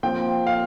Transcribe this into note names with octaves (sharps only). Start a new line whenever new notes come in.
A#2 F3 C4 G5
F5